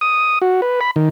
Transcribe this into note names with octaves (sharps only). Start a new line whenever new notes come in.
D#6
F#4
B4
B5
D#3